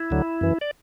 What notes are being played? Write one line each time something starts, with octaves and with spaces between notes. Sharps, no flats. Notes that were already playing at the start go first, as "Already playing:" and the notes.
Already playing: E4
D2 D3 F#3
F#2 E3
D5